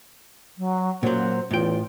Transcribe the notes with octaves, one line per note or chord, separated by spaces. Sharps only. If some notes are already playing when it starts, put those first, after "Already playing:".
F#3
F#2 A#2 F#3 A#3 C5 F#5
A1 E2 A2 F4 G5